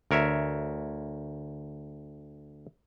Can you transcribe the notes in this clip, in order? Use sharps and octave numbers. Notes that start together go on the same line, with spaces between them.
D2 A#4 C#5 E5